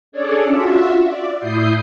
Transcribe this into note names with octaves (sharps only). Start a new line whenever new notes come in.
C#4 D4 G#4 A4 C#5 D5
F4 F#4 E5
D5
A2 E4 D#6 G6 C7